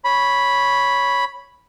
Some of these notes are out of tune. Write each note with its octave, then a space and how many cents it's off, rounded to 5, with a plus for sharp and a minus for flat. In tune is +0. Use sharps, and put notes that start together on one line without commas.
C#5 +0 B5 -5